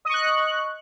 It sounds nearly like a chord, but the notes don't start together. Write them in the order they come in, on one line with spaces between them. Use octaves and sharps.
D#5 C#6 F#6